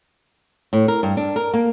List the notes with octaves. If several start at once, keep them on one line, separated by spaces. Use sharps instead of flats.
A2
A#4
G2
D4
A#4
A#3